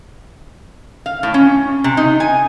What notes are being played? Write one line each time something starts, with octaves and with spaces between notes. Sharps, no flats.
F5
A2
C#4
C3
D#4
G#5